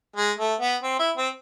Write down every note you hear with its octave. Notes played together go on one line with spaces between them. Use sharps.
G#3
A3
B3
C4
E4
C4